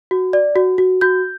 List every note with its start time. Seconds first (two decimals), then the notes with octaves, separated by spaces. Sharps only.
0.11 F#4
0.33 D5
0.56 F#4
0.78 F#4
1.01 F#4 G6